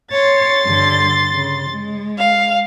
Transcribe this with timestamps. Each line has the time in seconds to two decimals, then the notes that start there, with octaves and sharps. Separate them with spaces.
0.12 C#5 C6 A6
0.65 G2 D3
1.32 C#3
1.70 G#3
2.18 F5